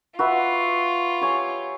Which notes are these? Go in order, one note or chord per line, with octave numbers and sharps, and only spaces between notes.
F4 F#4 B4 E5
G4 C#5 G#5